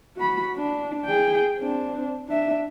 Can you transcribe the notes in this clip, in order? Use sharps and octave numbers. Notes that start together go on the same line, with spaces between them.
F#4 B5
D4
G#4 G5
C4 D4
D4 E5